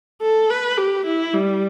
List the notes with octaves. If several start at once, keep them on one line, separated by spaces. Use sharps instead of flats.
A4
B4
G4
E4
G3